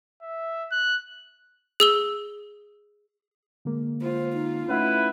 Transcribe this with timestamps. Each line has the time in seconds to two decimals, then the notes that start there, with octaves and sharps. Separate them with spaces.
0.22 E5
0.72 F#6
1.80 G#4 E6 G7
3.65 D3 G#3 A#3
4.02 F4 C5
4.33 D#4
4.68 A3 C#4 D#4 E4 B4 F#5